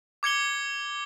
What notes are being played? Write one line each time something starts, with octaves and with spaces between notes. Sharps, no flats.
D6 G#6 C#7 G7